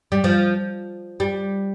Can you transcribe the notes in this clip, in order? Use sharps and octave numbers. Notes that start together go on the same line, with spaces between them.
G3
F3
G3